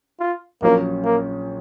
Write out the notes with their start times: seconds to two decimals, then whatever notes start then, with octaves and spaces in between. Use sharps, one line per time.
0.20 F4
0.62 A#1 A#2 F#3 A#3 C#4 F4
1.04 A#3